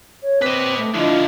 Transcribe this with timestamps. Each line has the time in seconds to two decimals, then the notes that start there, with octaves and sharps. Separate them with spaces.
0.23 C#5
0.42 C4 B4 D#5 D6
0.78 A3
0.94 D3 F3 D4 E4 F4 D#5